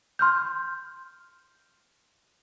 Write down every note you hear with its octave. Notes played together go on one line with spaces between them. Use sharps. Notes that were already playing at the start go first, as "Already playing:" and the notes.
C6 F6 G6